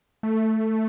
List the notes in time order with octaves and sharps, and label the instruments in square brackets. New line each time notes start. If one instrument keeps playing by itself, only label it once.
[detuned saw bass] A3